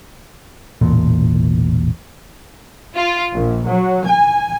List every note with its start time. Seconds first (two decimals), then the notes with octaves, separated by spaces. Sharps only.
0.81 E1 A1 A#2
2.96 F4
3.33 A#1
3.67 F#3
4.07 G#5